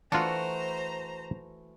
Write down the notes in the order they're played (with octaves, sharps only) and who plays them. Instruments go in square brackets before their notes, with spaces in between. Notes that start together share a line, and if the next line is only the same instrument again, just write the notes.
[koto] E3 A3 F#4 [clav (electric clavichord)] D4 F4 [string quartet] C5 A#5